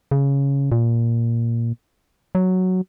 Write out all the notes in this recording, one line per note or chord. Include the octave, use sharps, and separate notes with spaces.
C#3
A#2
F#3